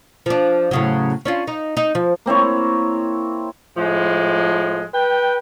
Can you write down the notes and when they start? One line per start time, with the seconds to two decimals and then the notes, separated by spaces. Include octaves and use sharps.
0.26 F3 D4
0.71 A2 C#3 F#3
1.25 C#4 D4 F4
1.47 D#4
1.77 D#4
1.95 F3
2.26 A#3 C4 E4 C#5
3.77 A2 F3 G#3
4.94 B4 G5